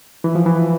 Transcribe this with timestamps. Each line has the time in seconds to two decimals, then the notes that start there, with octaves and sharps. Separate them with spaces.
0.24 E3
0.35 F3
0.46 E3